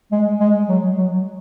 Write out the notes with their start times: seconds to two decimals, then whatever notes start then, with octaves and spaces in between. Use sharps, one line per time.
0.12 G#3
0.40 G#3
0.68 F#3
0.97 F#3